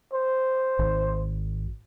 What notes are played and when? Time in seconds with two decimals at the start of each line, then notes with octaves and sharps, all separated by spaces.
0.13 C5
0.79 G#1